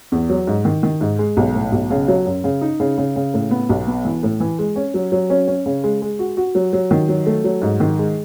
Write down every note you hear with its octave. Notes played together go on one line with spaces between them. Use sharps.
E2
F#3
G#2
D#3
D#3
G#2
G#3
B1
A2
B1
C#3
F#3
F#2
C#3
D#4
C#3
C#3
C#3
A2
B3
B1
B3
E3
A2
E3
G#3
C#4
F#3
F#3
C#4
C#4
C#3
G#3
G#3
F#4
F#4
F#3
F#3
D#3
F#3
A3
F#3
G#2
D#3
G#3